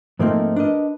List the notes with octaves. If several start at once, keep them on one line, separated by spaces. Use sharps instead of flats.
G#2 F3 A3 A#3 C4 D#4
D4 A#4 B4 D#5